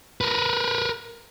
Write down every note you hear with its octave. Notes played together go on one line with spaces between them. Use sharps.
A#4 B4